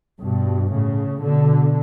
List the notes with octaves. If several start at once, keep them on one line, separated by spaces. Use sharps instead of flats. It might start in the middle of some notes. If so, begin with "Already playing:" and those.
G2 B2
A2 C#3
B2 D3